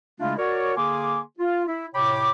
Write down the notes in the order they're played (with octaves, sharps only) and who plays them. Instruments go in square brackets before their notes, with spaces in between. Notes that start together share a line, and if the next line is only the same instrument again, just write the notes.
[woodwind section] C#3 G#3 A3 D4 E4 F4
F#4 A#4 C#5 D5
D3 A#3 G#4 G#5 C6 D6
F4
E4
A2 C3 C#5 G5 B5 D6